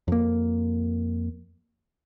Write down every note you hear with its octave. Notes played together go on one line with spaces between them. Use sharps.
F2 A#3